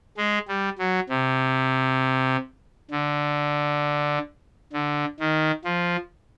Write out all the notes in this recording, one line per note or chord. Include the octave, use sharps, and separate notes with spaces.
G#3
G3
F#3
C3
D3
D3
D#3
F3